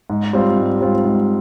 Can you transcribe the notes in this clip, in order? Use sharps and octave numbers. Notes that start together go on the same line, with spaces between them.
G#2
G3 C4 F4
G#2
G3 C4 F4
G#2